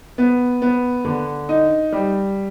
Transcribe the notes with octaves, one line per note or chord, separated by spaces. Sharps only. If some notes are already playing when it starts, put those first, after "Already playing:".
B3
B3
D3
D#4
G3